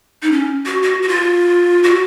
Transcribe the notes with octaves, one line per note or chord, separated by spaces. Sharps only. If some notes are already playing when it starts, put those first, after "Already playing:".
D#4
C#4
F#4
F#4
F#4
F4
F#4